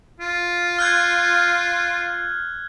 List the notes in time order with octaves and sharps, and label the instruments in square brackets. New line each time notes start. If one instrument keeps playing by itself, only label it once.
[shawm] F4
[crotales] F6 F#6 G#6